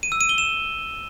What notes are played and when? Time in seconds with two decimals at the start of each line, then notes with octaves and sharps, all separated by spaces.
0.03 D#7
0.12 E6
0.21 D#7
0.29 G7
0.38 E7